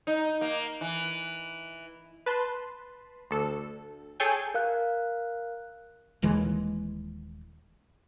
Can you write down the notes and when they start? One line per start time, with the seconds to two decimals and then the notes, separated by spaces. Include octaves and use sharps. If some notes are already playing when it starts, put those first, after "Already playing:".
0.07 D#4
0.41 A#3
0.81 E3
2.26 B4 A5 C6
3.31 D2 A4
4.20 G#4 A4 C#5 G5 G#5
4.54 A#4 F5 F#6
6.22 D#1 D#2 E3 G#3